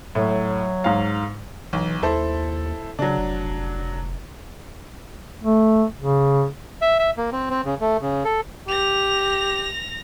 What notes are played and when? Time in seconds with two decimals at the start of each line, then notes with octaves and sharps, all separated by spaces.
0.15 A2 F#3
0.84 G#2 F5
1.73 B1 E3
2.03 D#2 E4 A4 C5
2.99 C#3 F#3 D4
3.18 F1
5.43 A3
5.98 C#3
6.82 E5
6.99 E5
7.17 A#3
7.32 C4
7.50 C4
7.65 C#3
7.81 A3
8.01 C#3
8.25 A4
8.68 G4 A#6 F7